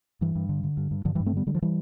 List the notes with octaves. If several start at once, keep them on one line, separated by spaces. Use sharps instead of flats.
G2 E3
G2
D3
D3
G2
G2
G2 D3 F3
E3 G3
G2
A3 C4
D3 G3 B3
D3 G3
F3
E3 G3